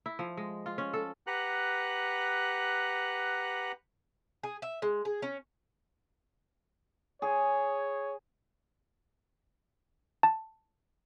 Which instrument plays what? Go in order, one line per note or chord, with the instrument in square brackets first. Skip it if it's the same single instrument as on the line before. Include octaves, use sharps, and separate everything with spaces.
[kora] E4
F3
G#3
F4
C#4
A4
[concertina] G4 B4 F#5 A#5 F#6
[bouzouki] G#4
E5
G#3
G#4
C#4
[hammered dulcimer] G#4 [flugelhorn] C#5
[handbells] A5